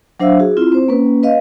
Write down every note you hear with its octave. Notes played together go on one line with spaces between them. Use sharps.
F#3 D4 C5 E5 F5 E6
F#4 G#4
C4 E4 F4
C4 C5
A#3 C#4 B4
B4 D#5 F5